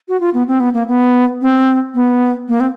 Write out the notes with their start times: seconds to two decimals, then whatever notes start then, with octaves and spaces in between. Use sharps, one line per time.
0.08 F#4
0.20 F4
0.34 B3
0.48 C4
0.60 B3
0.74 A#3
0.88 B3
1.41 C4
1.95 B3
2.48 A#3
2.60 C4